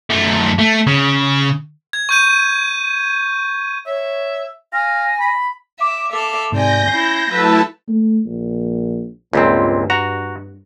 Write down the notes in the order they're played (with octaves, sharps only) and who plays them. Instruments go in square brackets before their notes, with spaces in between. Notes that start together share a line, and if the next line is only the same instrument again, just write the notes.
[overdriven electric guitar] F#2 A3
A3
C#3
[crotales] G#6
C#6 G6 D#7
[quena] C#5 [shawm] E5
[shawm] F5 [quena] G#5 [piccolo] A#6
[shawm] B5
[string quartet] E5 [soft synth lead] D6
[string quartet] A4 E5 F5
[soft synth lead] G#2 [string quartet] C3 D5 G#5 [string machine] G6 A#6
[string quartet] C#4 E4 [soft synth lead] C7
[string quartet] F#3 B4 [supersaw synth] A3 E4 [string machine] A5 [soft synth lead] E6
[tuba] A3
A#1
[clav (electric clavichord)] C#2 A#2 C4 [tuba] G2
[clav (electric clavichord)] F#4 A#5